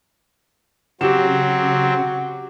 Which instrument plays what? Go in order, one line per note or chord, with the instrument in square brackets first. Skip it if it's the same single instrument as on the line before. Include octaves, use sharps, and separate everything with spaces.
[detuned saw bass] C#3 [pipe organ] F#3 C4 [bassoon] F#4 [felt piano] G4 E7